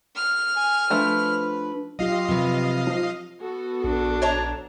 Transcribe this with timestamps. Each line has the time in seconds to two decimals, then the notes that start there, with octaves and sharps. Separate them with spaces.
0.16 F6
0.56 G#5
0.90 F3 A3 D4 B4
1.99 F#3 F4 G4 D#5 F5 C7
2.28 C3 F3 B4
2.87 F3
3.41 B3 F#4 A4
3.84 A#1 D4
4.22 C#5 A5 A#5